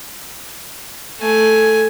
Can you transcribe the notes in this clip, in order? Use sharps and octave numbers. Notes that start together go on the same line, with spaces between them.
A3 G#5